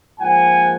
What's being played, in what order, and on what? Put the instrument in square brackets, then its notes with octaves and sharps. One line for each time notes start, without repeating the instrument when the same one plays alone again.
[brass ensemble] G#2 F3 A#3 F#5 G#5